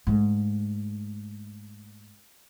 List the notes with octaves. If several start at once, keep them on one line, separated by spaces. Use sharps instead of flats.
G#2 A3